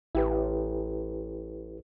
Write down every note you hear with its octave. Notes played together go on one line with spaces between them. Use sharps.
A1 E4 G4 B4